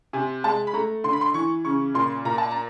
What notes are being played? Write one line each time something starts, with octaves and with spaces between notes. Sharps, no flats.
C3 G#5
G#3 A5
B5
A3 A#5
D3 C6
B5
C6
E3 C#6
C#3 C#6
A#2 C6
A#2 A#5
A5
A#5